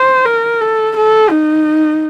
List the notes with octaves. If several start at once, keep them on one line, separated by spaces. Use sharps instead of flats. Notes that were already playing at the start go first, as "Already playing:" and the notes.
Already playing: C5
A#4
A4
A4
D#4